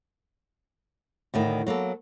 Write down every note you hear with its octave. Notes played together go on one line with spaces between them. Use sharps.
D2 A2 D#3
F#3 A#3 B3 A4